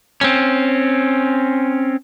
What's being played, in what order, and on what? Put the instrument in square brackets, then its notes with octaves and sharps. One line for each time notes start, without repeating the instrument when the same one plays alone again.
[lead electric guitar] C4 C#4